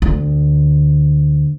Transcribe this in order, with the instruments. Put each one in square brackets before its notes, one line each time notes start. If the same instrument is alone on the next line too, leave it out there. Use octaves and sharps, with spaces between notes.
[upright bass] D2